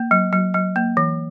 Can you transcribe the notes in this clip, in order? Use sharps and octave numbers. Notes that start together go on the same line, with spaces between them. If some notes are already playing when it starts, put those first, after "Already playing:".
Already playing: A#3
F#3
F#3
F#3
A#3
E3